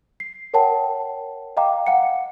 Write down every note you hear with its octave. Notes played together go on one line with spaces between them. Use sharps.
C7
A#4 C#5 F#5 G5 A5
D#5 F5 G5 A#5 D6
F5 F#5 C#7